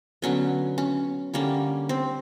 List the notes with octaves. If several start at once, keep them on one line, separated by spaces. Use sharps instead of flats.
D3 F#3 B3 C#4
C#4
D3 G3 A#3 C#4
C4